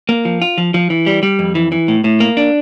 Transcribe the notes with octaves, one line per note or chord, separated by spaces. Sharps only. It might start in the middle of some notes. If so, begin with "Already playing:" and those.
A#3
F3
F4
F3
F3
E3
G3
G3
F2
E3
E3
A2
A2
A#3
D4